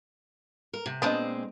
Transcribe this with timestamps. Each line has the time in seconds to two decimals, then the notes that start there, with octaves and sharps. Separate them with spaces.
0.73 A#4
0.86 C3
1.02 A#2 G#3 B3 C4 D4 D#5